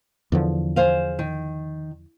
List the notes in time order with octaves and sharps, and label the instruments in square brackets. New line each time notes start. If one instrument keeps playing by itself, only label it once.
[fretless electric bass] E2 D3 F3
[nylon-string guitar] G#4 C5 F5
D#3